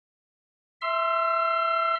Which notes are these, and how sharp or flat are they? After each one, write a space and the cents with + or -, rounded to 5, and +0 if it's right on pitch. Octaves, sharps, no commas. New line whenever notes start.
E5 +0 C6 +0 E6 +45